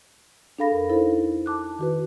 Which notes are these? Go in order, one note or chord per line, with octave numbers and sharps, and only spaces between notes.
D4 G#4 A4 F5 B5 A#6
F2 A#4
D#4 E4 A4 C5
A5 D6 F#6
D#3 F#4 B4